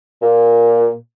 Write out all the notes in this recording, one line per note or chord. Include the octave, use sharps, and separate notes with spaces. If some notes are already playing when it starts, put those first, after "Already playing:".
A#2